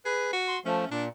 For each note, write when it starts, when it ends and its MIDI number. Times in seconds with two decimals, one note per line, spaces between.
0.05 0.31 68
0.05 0.31 71
0.33 0.57 66
0.48 0.59 84
0.65 0.85 53
0.65 0.85 57
0.65 0.87 61
0.91 1.09 46
0.91 1.05 62